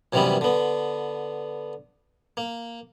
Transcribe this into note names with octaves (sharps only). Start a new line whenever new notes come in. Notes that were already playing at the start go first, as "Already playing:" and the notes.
F#2 C3 D#3 E3 G3 B3
D3 B3
A#3